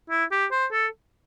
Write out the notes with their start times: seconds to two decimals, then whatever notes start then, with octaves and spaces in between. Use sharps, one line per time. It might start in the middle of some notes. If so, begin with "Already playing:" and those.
0.10 E4
0.31 G4
0.51 C5
0.72 A4